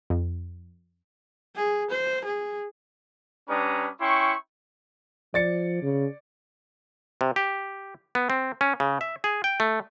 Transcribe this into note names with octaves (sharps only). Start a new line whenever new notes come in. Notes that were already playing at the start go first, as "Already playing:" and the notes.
F2
G#4
C5
G#4
G3 C#4 D4 B4 A#5 D#6
C#4 E4 G5 C6 C#6
F3 D5 A6 C#7
C#3
C3
G4
B3
C4
C#4
C#3
E5
G#4
G5
A3